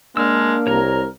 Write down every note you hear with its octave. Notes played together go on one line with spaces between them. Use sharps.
G#3 A#3 D4 E6 F6
C2 A#4 C#5 A#5